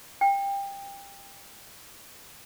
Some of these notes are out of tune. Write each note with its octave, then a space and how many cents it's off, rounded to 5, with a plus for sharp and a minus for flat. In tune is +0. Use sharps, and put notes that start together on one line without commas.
G5 +20